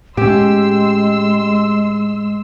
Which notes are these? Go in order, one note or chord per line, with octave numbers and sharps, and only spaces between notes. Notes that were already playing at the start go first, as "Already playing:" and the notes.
A2 G#3 C#4 G4 C6 E6